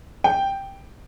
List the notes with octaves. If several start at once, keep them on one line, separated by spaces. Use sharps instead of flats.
G5